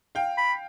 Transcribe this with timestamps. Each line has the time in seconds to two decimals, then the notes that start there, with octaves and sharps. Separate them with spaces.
0.15 F5 G5
0.37 B5